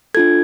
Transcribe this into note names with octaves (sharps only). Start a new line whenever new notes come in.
D4 F4 A4 G#6